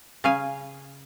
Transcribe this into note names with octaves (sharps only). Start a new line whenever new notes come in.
C#3 F5 G#5